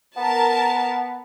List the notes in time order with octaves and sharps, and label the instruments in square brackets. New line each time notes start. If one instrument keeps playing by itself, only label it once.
[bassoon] B3 [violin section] A#4 A5